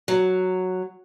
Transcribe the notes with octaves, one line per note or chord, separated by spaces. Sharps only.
F#3